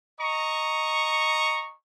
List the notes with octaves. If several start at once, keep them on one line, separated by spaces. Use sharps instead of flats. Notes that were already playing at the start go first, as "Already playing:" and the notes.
D#5 A#5 C#6